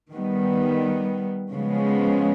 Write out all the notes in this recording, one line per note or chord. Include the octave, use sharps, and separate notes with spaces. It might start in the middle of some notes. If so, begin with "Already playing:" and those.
D#3 G3 B3
C#3 F3 G#3 B3